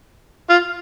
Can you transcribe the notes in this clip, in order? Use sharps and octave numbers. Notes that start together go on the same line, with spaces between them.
F4